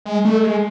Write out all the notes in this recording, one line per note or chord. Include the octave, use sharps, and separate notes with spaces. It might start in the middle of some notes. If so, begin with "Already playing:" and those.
G#3
A3
G#3